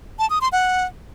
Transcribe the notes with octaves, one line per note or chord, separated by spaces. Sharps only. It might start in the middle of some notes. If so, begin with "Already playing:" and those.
A5
D#6
C6
F#5